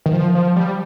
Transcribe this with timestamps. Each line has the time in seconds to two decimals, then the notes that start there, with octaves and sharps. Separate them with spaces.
0.06 D#3
0.13 F3
0.35 F3
0.56 G3